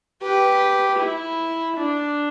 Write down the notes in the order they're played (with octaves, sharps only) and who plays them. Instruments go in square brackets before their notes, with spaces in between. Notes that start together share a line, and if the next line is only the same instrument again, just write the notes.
[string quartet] G4 B4
E4
D4